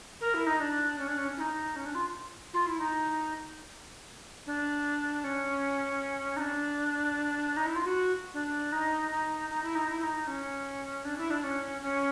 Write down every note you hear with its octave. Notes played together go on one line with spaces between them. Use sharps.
A#4
E4
D#4
D4
C#4
D4
C#4
E4
D#4
C#4
D4
F4
F4
E4
D#4
D4
C#4
D#4
D4
D#4
E4
F4
F#4
D4
D#4
D#4
D#4
E4
D#4
E4
E4
D#4
C#4
D4
E4
D4
C#4
C#4